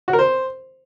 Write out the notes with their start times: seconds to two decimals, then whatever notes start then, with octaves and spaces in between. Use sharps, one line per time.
0.08 F#4
0.13 A#4
0.19 C5